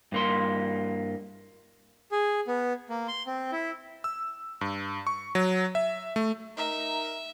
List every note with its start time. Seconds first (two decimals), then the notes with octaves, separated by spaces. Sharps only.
0.12 G2 A#3 C6
2.12 G#4
2.47 B3
2.89 A#3
3.08 C6
3.27 C4
3.52 E4
4.04 E6
4.61 G2
5.07 C#6
5.35 F#3
5.75 E5
6.16 A3
6.57 D#4 A#4 E5 A#5